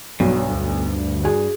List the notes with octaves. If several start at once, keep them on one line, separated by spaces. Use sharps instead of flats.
B1 G2 F#3
D2
F#4 G#4 G#5